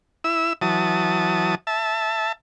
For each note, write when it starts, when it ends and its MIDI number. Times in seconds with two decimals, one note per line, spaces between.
0.24 0.53 64
0.24 0.53 88
0.62 1.55 52
0.62 1.55 54
0.62 1.55 81
0.62 1.55 87
1.67 2.32 76
1.67 2.32 81